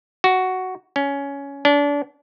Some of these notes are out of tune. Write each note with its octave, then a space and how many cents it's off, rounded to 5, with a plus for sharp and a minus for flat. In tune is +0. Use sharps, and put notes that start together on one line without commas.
F#4 +5
C#4 +15
D4 -30